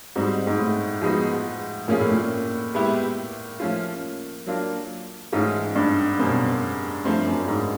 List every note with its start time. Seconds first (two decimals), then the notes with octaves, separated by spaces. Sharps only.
0.15 G#2 G3 C4 D#4 F#4
0.47 G#2
0.58 A2
1.01 F3 G#3 B3 D#4 F#4
1.88 A#2 F3 A#3 C#4 F4 G#4
1.99 A2
2.11 A#2
2.74 G#3 B3 E4 G4
3.60 F3 A3 C#4 F4
4.46 F#3 A#3 D4 F4
5.32 G#2 E3 A3 C#4 F4
5.75 G2
6.19 F#2 B2 G3 C4
7.05 G2 F3 A3 C4
7.26 F#2
7.48 G#2